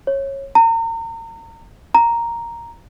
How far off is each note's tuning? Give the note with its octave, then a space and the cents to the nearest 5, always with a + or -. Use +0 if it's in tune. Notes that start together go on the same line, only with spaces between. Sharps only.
C#5 -20
A#5 -35
A#5 +0